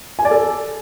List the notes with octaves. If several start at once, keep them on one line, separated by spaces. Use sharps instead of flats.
G#5
D5
A4